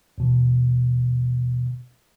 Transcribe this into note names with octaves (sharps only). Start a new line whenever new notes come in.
D#2 B2 E3